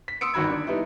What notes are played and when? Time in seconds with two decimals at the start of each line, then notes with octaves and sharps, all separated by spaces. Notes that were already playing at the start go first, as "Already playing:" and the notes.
0.08 B6
0.21 C6 D#6 E6 C#7 D7
0.34 G1 D#3 F#4 B5 G#6
0.50 D4
0.67 G3 B3 D#4 E4